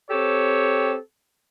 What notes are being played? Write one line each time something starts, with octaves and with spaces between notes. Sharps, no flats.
C4 G4 A4 C#5